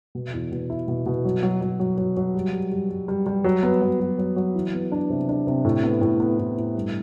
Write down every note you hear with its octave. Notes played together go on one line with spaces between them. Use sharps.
B2
E2
B2
E4
B2
B2
F#3
F#3
F#3
F#3
F#3
F#3
G3
G3
G3
G3
G3
G3
F#3
B3
F#3
F#3
F#3
F#3
E3
B3
D4
C3
D4
C3
A2
B3
A2
B3
A2
A2
G2